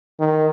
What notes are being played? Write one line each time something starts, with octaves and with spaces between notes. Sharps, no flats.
D#3